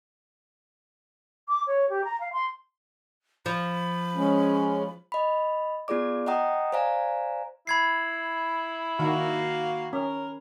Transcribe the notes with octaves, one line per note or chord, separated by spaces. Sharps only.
D6
C#5
G4
A#5
F5
C6
F3 B5
G#3 C#4
D#5 B5
B3 F4 G#4 D5 D6
D#5 F#5 G5 A#5 D#6
C5 D5 F5 G#5 A#5
E4 B5 G#6 C7
D#3 A#3 F#4 F5
C#4 A#4